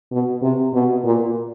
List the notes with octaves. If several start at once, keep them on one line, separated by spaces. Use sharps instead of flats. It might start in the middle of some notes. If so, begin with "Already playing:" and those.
B2
C3
B2
A#2